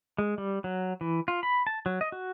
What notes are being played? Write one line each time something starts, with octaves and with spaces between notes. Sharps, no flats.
G#3
G3
F#3
E3
F4
B5
A5
F#3
D#5
F#4